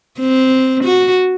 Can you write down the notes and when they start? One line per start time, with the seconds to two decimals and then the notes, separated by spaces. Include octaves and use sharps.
0.19 C4
0.84 F#4